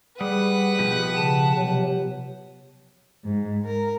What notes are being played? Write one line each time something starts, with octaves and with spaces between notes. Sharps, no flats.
G3 G#4 B4 F#5
B2 F3 G4
C#3 A5
C3 F#3
G#2
A#4